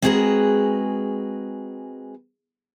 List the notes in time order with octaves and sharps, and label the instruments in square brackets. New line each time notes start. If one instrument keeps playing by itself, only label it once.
[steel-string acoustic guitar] G#3 C4 F#4 G#4 A#4 B4